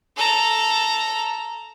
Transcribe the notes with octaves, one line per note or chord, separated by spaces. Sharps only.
A4 A#5